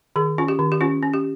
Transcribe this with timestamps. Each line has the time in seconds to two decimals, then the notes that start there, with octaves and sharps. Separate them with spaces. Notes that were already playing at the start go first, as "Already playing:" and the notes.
0.16 D#3 G#4
0.38 C#4 F4
0.48 G4
0.59 D#3
0.72 G4
0.81 C#4 F4
1.03 C#4
1.14 G4